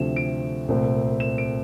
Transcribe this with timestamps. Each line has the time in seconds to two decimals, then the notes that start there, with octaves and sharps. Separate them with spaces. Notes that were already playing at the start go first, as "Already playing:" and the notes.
Already playing: D2 C3 F3 A3 C4 E7
0.16 D7
0.68 C2 A#2 A3 C4
1.20 E7
1.38 D7